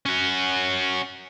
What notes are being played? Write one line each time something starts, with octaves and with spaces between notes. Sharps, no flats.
C#4 F#4